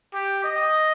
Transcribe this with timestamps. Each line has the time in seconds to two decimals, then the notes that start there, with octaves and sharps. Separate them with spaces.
0.14 G4
0.44 D#5